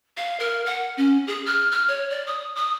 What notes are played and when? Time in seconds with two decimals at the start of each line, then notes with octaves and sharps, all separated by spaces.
0.17 F5
0.40 A#4
0.66 F#5
0.97 C#4
1.27 G#4
1.46 F6
1.71 F6
1.88 C#5
2.10 D5
2.27 D#6
2.55 D#6